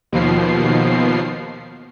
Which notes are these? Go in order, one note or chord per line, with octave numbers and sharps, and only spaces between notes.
D#2 B2 F3 C7